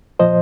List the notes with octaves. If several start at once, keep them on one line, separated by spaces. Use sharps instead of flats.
A#2 F3 C5 D#5